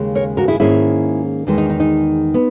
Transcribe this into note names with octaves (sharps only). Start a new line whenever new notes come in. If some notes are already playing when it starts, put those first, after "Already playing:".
Already playing: D#2 C#3 G#3
A#4 C#5
F#4 A#4
E4 G#4
G#2 D#3 A#3 C#4 E4 G#4
E2 D#3 G#3
D#4
D#4
D#4
B3